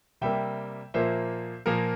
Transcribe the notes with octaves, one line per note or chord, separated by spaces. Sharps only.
C3 G3 A#3 E5 G5
A#2 F3 A#3 C5 E5
A#2 F3 A#3 A#4